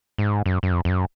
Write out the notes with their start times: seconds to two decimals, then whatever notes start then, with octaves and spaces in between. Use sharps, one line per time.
0.18 G#2
0.46 F#2
0.63 F#2
0.72 F2
0.85 F2
0.90 F#2